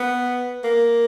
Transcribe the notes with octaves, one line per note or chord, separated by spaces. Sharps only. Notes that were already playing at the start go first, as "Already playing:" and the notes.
Already playing: B3
A#3